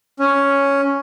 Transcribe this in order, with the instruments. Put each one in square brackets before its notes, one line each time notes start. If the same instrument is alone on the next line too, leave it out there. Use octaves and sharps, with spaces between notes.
[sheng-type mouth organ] C#4